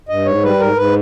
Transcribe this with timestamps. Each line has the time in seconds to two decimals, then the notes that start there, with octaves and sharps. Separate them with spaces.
0.09 G2 D#5
0.26 G#2 C#5
0.43 G3 B4
0.60 G#2 A#4
0.77 G#2 B4